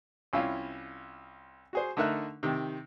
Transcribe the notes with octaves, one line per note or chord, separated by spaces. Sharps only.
C2 C#4 E4 F4
F#4 G#4 C5
D3 A3 D#4 A#4 E5 F#6
C3 D#3